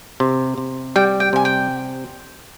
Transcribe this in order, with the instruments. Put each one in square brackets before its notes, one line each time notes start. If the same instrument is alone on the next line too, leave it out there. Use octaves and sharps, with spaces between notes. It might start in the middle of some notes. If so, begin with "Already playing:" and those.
[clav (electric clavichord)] C3
C3
[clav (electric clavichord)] G3 [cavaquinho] G5
[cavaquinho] G5
[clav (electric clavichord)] C3 [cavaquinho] G#5
[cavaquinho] G5